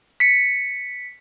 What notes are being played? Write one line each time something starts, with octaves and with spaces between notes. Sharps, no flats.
B6 C#7